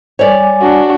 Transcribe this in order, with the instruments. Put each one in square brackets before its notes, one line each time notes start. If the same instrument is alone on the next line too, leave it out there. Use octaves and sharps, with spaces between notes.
[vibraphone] G3 G#5 D6 [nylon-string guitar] C#5 D5
[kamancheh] D4 F#4